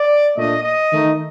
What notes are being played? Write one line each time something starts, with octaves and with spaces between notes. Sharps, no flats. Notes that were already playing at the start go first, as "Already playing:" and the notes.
Already playing: D5
A#2 A3 D4 D#5
D#5
D#3 A3 D#4